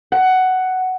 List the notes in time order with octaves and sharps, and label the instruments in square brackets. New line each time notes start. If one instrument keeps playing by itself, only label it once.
[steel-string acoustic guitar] F#5